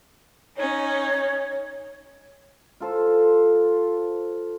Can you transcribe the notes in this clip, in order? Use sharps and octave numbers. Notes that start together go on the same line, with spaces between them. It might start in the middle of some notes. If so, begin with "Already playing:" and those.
C#4 D#4 C#5
F4 A4 C5